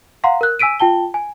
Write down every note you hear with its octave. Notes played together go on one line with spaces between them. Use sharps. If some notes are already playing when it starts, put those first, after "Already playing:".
F5 F#5 A#5 C6
A#4 F#6
G#5 E6 B6 D7 D#7
F4 G5 A5 G7
G#5